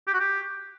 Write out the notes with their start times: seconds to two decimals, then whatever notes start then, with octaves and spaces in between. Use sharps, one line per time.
0.07 G4
0.14 F#4
0.20 G4